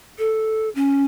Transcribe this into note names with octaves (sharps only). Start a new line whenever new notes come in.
A4
C#4